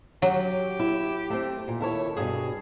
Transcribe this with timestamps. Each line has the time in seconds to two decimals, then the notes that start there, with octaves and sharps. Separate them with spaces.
0.22 F#3 G4
0.80 E4
1.30 A3 C4
1.68 A#2
1.80 D#3 E4 A4 C#5
2.16 G2 B2 G#4